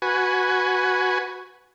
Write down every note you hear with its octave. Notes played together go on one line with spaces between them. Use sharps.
F#4 B4 G#5